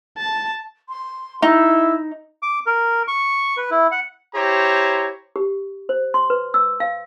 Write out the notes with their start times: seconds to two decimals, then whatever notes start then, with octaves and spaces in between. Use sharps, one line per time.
0.18 A5
0.89 C6
1.42 D#4 E4
2.43 D6
2.66 A#4
3.08 C#6
3.57 B4
3.71 E4
3.91 F#5
4.34 E4 G4 C5 C#5 A#5
5.36 G4
5.89 C5
6.14 C6
6.30 B4
6.54 E6
6.80 F5